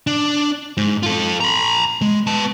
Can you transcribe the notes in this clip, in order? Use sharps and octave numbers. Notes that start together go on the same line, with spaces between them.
D4
G#2
F4 A4
A#5 B5
G#3
B3 A5